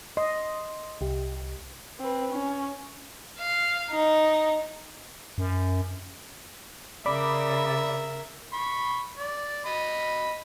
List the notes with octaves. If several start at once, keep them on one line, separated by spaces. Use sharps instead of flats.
D#5 C6
C2 G4
C4 B4
C#4
F5
D#4
F#2
C#3 A#4 D5 E5 B5 D6
B5 C#6
D5
D#5 B5